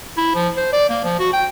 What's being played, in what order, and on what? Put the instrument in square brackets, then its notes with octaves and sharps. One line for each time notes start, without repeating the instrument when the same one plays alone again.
[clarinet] E4
F3
C5
D5
A#3
F3
F#4
G5